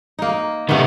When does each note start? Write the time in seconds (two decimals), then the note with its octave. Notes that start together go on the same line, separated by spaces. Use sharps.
0.19 A#3 D#4
0.69 C3 D#3 A3 B3